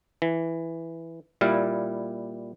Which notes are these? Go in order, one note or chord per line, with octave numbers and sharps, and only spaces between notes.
E3
A#2 G3 E4 F5